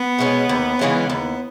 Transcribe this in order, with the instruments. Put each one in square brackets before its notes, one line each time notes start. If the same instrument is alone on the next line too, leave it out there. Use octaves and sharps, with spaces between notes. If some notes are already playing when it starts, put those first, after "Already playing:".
Already playing: [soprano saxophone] B3
[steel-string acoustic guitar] B2 G#3 C#4
D#2
C#3 E3 G#3 C#4
[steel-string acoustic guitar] D#2 [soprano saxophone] B3